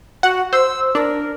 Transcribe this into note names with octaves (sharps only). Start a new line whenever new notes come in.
F#4 F#5
C5 E6
D4 A#4